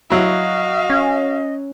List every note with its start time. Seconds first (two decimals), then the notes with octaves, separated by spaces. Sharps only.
0.10 F#3 E4 F#4 D#5 F5
0.90 C#4